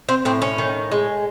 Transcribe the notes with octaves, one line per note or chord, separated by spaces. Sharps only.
C4
A2 C4
C#4
D#3
G#3